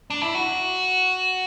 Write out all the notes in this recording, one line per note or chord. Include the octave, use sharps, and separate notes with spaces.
D4
E4
F#4